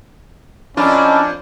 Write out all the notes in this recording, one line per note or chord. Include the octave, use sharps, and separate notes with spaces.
F2 C#4 D4 E4 F4 A#4